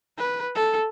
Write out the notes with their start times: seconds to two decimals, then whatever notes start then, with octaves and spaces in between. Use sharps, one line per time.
0.18 B4
0.55 A4